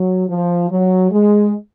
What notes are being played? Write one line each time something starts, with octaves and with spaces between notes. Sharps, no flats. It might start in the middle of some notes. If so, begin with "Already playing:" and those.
Already playing: F#3
F3
F#3
G#3